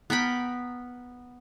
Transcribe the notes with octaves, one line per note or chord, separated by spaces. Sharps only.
B3 A#4 G5 B5